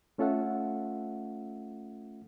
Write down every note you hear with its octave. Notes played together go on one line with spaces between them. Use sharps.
A3 C#4 F4 A4 E5 F#5